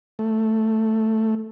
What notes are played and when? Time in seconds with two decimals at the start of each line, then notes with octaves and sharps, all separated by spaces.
0.19 A3